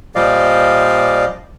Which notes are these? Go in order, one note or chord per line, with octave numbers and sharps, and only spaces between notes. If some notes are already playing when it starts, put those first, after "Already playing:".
A#2 F3 G3 D5 D#5 F5